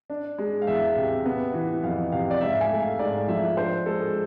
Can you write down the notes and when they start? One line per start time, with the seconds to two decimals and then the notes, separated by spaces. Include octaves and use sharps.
0.10 D4
0.38 G#3
0.62 F5
0.67 E2 E5
0.96 C3
1.26 B3
1.54 E3
1.83 F2 F5
2.12 C3 F5
2.31 D5
2.41 G#2 E5
2.50 F5
2.61 G#5
2.71 A3
2.80 F5
2.99 G#2 D5
3.28 F3 E5
3.57 D4 C5
3.86 G#3 A4